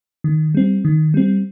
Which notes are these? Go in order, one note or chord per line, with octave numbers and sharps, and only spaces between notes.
D#3
G3 C4
D#3
G3 C4